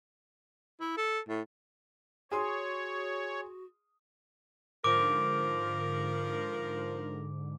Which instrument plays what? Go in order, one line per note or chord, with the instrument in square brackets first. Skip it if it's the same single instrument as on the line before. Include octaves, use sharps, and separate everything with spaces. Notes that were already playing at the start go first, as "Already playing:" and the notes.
[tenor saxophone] E4
A4
A2
[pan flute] F#4 [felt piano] G#4 C6 D#6 [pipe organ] C#5
[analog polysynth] G#2 D3 [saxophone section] F3 A#4 [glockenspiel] D6 D7